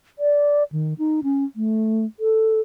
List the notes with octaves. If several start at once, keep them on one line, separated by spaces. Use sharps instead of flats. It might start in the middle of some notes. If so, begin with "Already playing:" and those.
D5
D#3
D#4
C#4
A3
A4